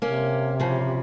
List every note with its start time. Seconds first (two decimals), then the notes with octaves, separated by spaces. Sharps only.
0.02 C3 A#3 C#4
0.60 C#3 F3